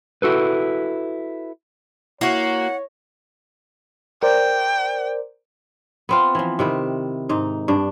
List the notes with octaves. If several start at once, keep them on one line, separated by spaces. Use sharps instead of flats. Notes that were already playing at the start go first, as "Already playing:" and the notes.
E4 F#4 A4 B4
A#3 E4 F#4 C#5 F#5
A#4 C5 D5 G5
B3 C4 F4
E3 F3
C3 D#3 E4
G#2 D#4
G2 D4